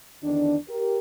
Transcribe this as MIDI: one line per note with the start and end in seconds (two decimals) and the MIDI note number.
0.23 0.56 40
0.23 0.56 50
0.23 0.56 51
0.23 0.56 62
0.69 0.99 67
0.69 0.99 70